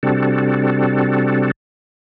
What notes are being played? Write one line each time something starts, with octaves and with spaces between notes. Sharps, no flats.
C3 G3 C4 D4 F#4 A4